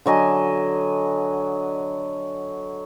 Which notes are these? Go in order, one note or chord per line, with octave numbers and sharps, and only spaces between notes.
D3 F#3 D#5 G#5